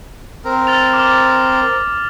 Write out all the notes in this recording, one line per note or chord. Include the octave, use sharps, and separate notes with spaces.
C4 A#4
F6 A6 F7
D6 F6